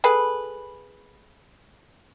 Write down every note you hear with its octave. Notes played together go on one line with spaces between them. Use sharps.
G#4 A4 B4